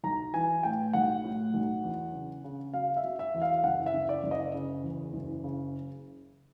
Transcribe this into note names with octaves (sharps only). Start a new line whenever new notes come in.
B1 A#5
E3 G#5
A2 G5
B1 F#5
A2
B1
E2
C#3
C#3
F#3 F5
E5
F#3
E5
E2
F5
F#1 F#5
E5
F#1
D5
F#1
D#5
C#3
E2
F#1
C#3